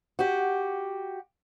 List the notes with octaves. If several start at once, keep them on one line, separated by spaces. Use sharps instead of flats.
F#4 G4